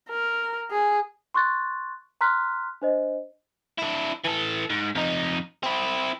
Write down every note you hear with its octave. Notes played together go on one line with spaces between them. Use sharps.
A#4
G#4
C6 C#6 F#6 A6
A#5 C6 F6 F#6 B6
D4 C5 D#5
D4 E4
E3 A4
G#2
F2 D#4
C4 E4